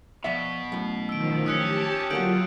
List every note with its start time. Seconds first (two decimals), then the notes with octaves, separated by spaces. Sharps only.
0.24 B2 F3 D5 E5 B6
0.72 F#2 A2
1.09 D#3 F3 E6 D7
1.46 C#4 G4 A5 D#6 F#6 C#7
2.11 D3 F#3 A#3 F4 F#4 G6 D7 F#7